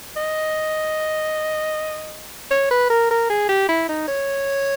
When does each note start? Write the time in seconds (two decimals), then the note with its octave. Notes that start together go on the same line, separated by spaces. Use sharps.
0.16 D#5
2.51 C#5
2.71 B4
2.90 A#4
3.11 A#4
3.30 G#4
3.49 G4
3.69 E4
3.89 D#4
4.08 C#5